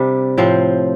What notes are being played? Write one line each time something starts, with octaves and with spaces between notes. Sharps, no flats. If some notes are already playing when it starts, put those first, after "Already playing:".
Already playing: C3 G3 D4
A2 F3 C4